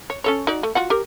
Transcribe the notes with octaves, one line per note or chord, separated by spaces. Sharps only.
C#5
C#4 A4 C#5
D#4 F#4 D5
A3
F4 F#4 F#5
G4 A#4